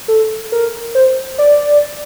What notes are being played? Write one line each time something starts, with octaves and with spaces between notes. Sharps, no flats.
A4
A#4
C5
D5